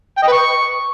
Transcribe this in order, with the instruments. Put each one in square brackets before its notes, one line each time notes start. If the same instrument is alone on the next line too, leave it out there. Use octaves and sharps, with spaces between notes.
[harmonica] G5
D#5
B4
C#6